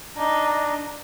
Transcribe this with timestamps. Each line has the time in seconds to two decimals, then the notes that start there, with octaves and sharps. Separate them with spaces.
0.18 D4 D#4